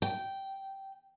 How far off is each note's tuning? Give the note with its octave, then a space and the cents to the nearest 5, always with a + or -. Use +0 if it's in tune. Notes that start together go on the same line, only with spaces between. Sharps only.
G5 -10